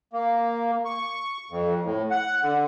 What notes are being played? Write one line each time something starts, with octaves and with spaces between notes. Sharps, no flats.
A#3
C#6
F2
A2
F#5
D3